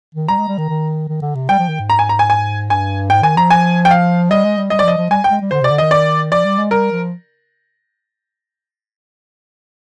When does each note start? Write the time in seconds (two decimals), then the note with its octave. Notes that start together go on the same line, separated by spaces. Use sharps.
0.15 D#3
0.28 G3 A#5
0.39 G#3
0.48 G3
0.59 D#3
0.69 D#3
1.09 D#3
1.22 D3
1.35 C3
1.49 G3 G5
1.59 F3
1.69 D#3
1.80 G#2
1.90 A#5
1.99 G#5
2.09 A#5
2.19 G#5
2.30 G#5
2.70 G2 G#5
3.10 G#2 G5
3.23 D#3 G#5
3.37 F3 A#5
3.50 G#5
3.85 G5
3.91 F5
4.30 G3 D#5
4.44 G#3
4.58 G3
4.70 G3 D#5
4.79 D5
4.84 F3 D#5
4.98 F3
5.10 G3 G#5
5.24 G5
5.31 G#3
5.41 G3
5.51 D3 C5
5.61 C3 D5
5.71 D3
5.78 D#3 D#5
5.91 D5
6.32 F3 D5
6.45 G3
6.58 G#3
6.71 G3 A#4
6.92 F3